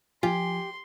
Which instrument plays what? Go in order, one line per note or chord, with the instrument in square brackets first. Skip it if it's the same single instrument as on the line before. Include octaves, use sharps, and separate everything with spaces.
[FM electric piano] F3 G#5 [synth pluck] F4 [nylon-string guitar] G4 [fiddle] C6